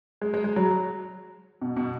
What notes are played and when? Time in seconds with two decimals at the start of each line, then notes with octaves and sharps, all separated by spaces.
0.21 G#3
0.34 G#3
0.44 G#3
0.56 F#3
1.62 B2
1.77 B2